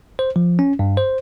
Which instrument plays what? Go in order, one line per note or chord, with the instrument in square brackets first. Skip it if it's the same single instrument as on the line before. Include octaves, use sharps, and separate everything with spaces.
[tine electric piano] C5
F3
C#4
G2
C5